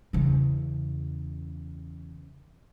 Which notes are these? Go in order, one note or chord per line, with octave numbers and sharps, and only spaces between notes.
E2 C#3